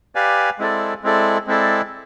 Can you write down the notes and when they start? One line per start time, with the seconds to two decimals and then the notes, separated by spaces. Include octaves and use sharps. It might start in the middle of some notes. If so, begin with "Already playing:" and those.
0.15 G4 B4 D5 F5 G#5
0.59 G#3 C4 E4 A4 D5
1.03 G#3 C4 E4 A4 D5
1.47 G#3 C4 E4 A4 D5